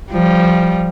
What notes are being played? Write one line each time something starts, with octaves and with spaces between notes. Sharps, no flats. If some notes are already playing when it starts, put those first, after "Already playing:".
F3 G3